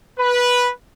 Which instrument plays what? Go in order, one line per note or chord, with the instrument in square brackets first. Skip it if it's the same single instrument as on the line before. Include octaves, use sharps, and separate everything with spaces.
[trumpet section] B4